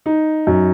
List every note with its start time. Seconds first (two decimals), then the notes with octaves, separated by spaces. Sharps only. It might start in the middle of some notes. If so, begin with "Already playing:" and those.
0.06 D#4
0.47 F#2